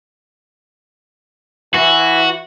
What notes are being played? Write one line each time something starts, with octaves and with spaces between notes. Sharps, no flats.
E3 F#4